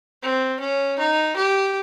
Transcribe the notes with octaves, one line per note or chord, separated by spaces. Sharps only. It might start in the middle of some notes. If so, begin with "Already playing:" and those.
C4
C#4
D#4
G4